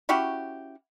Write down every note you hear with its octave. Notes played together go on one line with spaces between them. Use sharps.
C#4 E4 F#4 G4